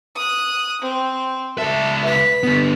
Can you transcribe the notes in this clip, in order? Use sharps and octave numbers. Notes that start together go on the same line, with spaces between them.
D#6 F#6
C4
C#2 A4 E5
B4 B6
D3 B3